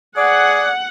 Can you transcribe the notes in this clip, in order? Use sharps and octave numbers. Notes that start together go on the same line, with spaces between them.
G#4 D5 F#5